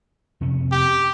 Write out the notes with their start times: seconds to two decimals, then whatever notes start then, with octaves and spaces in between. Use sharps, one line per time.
0.41 F2 C3 C#4
0.72 G4